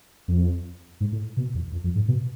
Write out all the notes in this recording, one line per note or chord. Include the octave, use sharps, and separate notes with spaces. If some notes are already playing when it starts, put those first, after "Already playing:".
F2
G#2
A2
B2
E2
F2
F2
G#2
B2